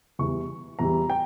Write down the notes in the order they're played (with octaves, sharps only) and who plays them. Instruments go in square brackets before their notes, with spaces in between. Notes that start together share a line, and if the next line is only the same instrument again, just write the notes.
[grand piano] E2 E3 G3 C#6
E2 E3 G3 A#5
G5